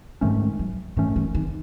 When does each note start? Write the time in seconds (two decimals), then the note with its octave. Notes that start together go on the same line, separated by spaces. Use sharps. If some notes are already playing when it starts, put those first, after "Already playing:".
0.21 G#2 D#3 G#3 A3 C#4
0.59 F#3
0.97 G#2 D#3 E3 A3 C#4
1.16 E3
1.35 D#3